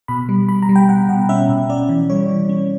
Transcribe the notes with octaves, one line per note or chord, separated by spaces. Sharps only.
B2 B5
G3
G3 B5
A#5
G3
G5
B2 F#5
B2 F#5
C#4 E5
B2
C#4 D5
E3
G3 C#5
E3
C#4